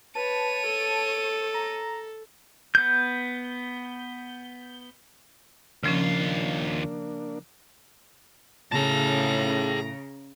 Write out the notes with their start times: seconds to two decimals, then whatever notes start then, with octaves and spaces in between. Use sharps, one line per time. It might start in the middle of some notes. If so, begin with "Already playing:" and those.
0.15 B4 C#5 A5 D#7
0.66 A4
1.54 A#5
2.75 B3 G6
5.83 D#2 C#3 F3 A#3 C#4 D4 F4
8.72 A2 C#3 G#4 A5 A#5